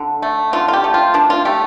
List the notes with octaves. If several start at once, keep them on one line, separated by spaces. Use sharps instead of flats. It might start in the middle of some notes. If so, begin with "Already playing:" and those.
Already playing: D3
A3
D3 F4
F4
G4
A3
F4
F3 D4
F4
A3 G4